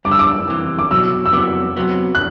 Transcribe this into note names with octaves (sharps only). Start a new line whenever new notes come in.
G2 D3 G3 D6
E6
D6
C2 C3 E3
D6
C2 B2 F#3 E6
E6
C2 C3 F#3 B3 D6
C3 F#3 B3
F#6